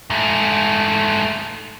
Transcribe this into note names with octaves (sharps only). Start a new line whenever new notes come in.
G#2 A3